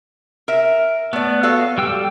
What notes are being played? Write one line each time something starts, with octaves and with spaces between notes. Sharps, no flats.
A#4 E5
A3 B3 D5
F#4 A4 F5
G3 G5 E6